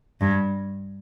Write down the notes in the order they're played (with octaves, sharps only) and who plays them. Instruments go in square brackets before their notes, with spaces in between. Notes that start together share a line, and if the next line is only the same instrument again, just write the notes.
[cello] G2